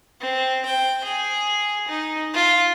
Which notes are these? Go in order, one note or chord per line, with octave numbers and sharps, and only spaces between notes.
C4
G5
G#4
D#4
F4